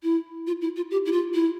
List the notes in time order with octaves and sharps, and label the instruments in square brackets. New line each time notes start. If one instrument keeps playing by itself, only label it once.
[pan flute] E4
F4
E4
F4
G4
E4
F4
E4